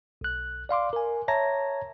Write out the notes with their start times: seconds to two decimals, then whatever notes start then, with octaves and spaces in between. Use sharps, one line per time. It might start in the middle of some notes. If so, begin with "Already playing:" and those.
0.21 B1 F#6
0.69 D5 F5 C6 D6
0.93 A#4 G#5
1.28 C#5 E5 A5 A#5 G#6 A#6